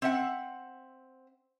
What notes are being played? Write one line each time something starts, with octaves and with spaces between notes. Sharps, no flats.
C4 E5 F#5